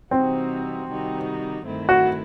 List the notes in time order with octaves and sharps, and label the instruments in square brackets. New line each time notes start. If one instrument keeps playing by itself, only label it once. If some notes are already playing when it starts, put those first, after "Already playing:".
[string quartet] C3 E3 G3 D#4 F#4 [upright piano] C4
[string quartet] C3 D#3 G3 D#4 F#4
G2 D#3 A3 C4 E4
[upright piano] F#4